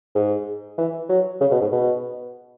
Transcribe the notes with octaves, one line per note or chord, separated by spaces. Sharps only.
G#2
E3
F#3
C#3
B2
G#2
B2